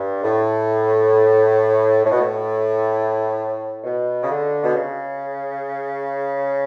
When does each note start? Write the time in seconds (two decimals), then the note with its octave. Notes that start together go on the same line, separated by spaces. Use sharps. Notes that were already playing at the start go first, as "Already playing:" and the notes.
Already playing: G2
0.24 A2
2.04 A2
2.11 B2
2.19 A2
3.84 B2
4.23 C#3
4.29 D3
4.64 B2
4.74 C#3